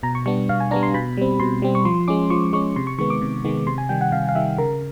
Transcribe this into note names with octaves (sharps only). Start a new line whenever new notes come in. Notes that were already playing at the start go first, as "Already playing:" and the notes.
B2 A#5
C#6
G3 B3 D4 C#6
B2 F5
G#5
G3 B3 D4 A#5
C6
B2 B5
G3 C4
B2 C6
G3 C4
C#6
F3 C6
G#3 C#4 D6
F3 C#6
G#3 C#4 C#6
C3 C6
C#6
D#3 G#3 B3 C#6
D6
C3
D#3 G#3 B3
C3 C6
G#5
D#3 G3 G5
F#5
C3 F5
F5
D#3 G3 E5
C#3 A#4